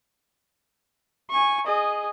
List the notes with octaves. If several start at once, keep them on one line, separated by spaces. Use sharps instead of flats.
G#5 C#6
G#4 D#5